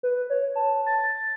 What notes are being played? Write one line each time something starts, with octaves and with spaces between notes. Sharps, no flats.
B4
C#5
A5
A6